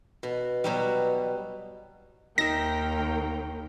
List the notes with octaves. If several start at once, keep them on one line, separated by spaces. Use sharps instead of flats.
B2
B2 F#3 G3
D#2 D#4 A#4 E5 G5 A#6